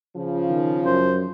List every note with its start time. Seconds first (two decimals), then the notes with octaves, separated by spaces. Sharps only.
0.17 C#3 F3
0.50 D#3
0.86 F#2 C5